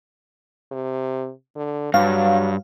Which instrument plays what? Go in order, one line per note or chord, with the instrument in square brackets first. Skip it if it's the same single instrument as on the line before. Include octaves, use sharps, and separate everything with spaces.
[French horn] C3
D3
[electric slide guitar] G2 [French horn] F#3 [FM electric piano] F5